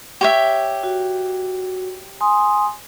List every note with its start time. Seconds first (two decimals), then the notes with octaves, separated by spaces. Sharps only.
0.21 G4 C#5 E5
0.84 F#4
2.21 G#5 C6 D#6